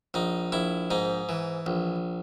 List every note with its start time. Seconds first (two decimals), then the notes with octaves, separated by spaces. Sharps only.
0.14 A#1 D#4
0.52 A#1 E4
0.91 G#2 D#4
1.29 E3
1.66 A#1